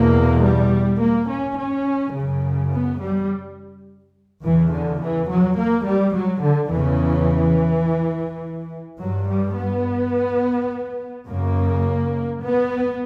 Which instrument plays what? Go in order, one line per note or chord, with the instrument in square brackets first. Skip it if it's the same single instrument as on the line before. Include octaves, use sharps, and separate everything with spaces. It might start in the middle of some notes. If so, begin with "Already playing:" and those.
Already playing: [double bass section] E2 B2 A#3
G3
A#3
C#4
C#4
F#2 C#3
B3
G3
E2 C#3 E3
D3
E3
F#3
A#3
G3
F#3
D3
E2 C#3 E3
G2 F#3
G3
B3
F#2 C#3 A#3
B3